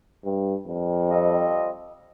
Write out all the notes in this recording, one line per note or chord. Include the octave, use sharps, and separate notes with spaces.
G2
F2
G3 C4 F4 A4 D#5